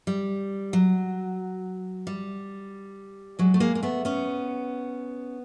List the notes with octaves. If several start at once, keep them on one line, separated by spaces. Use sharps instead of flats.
G3
F#3
G3
F#3 G#3
A3
G#3 A#3
A#3
A3 B3
B3 C#4